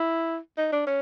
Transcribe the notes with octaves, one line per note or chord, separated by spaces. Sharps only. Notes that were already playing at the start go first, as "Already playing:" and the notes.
Already playing: E4
D#4
D4
C#4